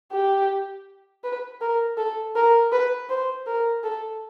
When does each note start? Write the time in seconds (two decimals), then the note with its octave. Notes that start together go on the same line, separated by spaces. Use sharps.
0.12 G4
1.24 B4
1.61 A#4
1.98 A4
2.36 A#4
2.72 B4
3.10 C5
3.47 A#4
3.84 A4